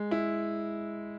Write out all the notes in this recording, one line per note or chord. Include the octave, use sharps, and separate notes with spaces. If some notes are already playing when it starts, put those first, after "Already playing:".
Already playing: G#3
E4